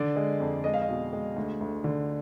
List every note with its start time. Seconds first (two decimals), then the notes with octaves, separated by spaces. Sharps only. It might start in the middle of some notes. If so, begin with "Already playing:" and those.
Already playing: D3 D5
0.16 G#3
0.40 F2
0.64 G#3 D#5
0.74 F5
0.82 D#5
0.88 B2
1.13 G#3
1.36 D2
1.61 D2
1.84 D3